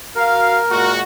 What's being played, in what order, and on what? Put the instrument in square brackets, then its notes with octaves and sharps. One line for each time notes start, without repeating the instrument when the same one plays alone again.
[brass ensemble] F#4 F5 [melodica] A#4
[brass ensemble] A#2 G#3 F#4